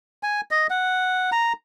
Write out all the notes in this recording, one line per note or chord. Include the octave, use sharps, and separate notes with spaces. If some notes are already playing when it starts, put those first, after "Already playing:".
G#5
D#5
F#5
A#5